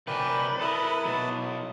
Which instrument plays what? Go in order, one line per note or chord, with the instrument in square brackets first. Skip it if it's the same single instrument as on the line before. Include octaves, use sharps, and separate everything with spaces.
[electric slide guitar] C3 F#3 G#5 [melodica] A#4 D5 G5 [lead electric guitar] B4
[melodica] E4 A5 D#6 [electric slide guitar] A4 A#4
[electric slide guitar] B2 F#3